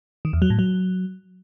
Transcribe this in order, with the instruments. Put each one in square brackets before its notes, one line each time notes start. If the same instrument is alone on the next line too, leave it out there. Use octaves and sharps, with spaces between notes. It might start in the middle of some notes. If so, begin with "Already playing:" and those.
[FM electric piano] D#3
E2
F#3
A2
F#3